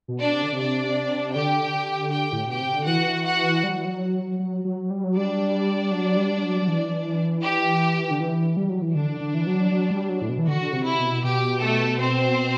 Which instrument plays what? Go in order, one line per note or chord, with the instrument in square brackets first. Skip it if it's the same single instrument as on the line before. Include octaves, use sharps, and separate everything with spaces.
[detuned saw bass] B2
[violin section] D4 D5
[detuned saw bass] C3
D3
C3
[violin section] D4 D5
[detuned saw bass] D3 [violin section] G4 G5
[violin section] G4 G5
[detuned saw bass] A2
[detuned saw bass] B2 [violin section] G4 G5
[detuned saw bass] C3
D3
[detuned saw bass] E3 [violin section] F#4 F#5
[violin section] F#4 F#5
[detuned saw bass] G3
F#3
E3
F#3
F#3
F#3
G3
F#3
[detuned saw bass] G3 [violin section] D4 D5
[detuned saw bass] F#3
G3
G3
F#3
F#3
E3
[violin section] G4
[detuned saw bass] D3
E3
G3
F#3
E3
[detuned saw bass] D3 [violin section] D4
[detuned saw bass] D3
E3
F#3
F#3
G3
F#3
A2
B2
E3
[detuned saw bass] D3 [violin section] F#4
[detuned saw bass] D3
C3
[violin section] E4
[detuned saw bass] B2
[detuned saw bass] B2 [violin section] G4
[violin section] A3 A4
C4 C5